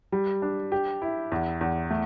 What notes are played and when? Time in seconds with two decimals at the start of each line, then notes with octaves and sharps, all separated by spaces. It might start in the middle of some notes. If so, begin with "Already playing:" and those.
0.12 G3
0.42 D4
0.72 G4
1.02 E4
1.32 E2
1.61 E2
1.91 A3